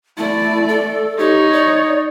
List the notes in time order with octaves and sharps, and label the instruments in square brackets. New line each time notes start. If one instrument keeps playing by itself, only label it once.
[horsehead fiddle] A3 D5 [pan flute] E4
[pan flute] A4
[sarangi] D#4 [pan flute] G4 [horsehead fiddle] C#5
[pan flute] D5